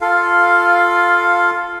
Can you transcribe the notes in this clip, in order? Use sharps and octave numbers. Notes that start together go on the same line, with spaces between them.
F4 A4 F5